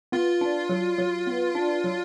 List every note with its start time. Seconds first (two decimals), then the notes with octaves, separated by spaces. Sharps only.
0.12 B3 F4
0.41 D4
0.69 F#3
0.98 F#3
1.27 B3
1.55 D4
1.84 F#3